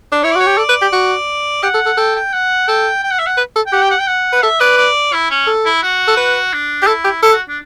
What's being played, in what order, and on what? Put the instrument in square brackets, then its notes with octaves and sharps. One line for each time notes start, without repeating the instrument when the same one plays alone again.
[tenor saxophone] D4
[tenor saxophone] E4 [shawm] C#5
[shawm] D5
[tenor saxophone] F#4 [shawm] C#5
[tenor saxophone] G4
[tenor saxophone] A4 [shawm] D5
[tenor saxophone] B4
G4
F#4
[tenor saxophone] G4 [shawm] F#5
[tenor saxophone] A4
A4
[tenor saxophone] A4 [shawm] G5
[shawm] G5
F#5
[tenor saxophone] A4 [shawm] G5
[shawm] G5
F#5
E5
F#5
[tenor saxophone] B4
A4
[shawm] G5
[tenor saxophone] G4 [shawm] F#5
[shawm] G5
F#5
G5
F#5
[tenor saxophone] B4
[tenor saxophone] A4 [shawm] E5
[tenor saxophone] B4 [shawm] D5
[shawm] D5
E4
C#4
[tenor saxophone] A4
[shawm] E4
F#4
[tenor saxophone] A4
B4
[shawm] D4
[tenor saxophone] G4
[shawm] E4 [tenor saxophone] A4
[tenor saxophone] G4
[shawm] E4 [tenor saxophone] A4
[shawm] F#4
D4